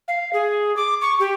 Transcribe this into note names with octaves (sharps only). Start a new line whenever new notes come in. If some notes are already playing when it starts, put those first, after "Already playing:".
F5
G#4
D6
C#6
G4